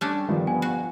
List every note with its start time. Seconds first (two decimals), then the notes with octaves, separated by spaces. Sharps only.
0.01 G3 A3 C#4 D4
0.28 G1 D#3 F3 G3
0.47 B3 G#5
0.62 F#4